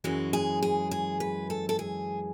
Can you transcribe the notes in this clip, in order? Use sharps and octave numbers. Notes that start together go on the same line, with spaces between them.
F#2 E3 G#3 F#4
G#4
G#4
G#4
B4
A4
A4
G#4